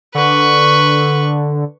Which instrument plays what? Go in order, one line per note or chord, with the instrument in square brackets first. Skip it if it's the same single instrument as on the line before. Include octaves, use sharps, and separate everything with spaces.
[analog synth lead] D3 [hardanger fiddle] B4 C#6